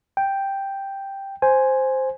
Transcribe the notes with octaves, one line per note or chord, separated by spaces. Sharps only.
G5
C5 G#5